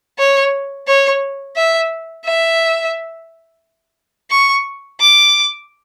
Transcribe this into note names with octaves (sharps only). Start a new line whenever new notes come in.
C#5
C#5
E5
E5
C#6
D6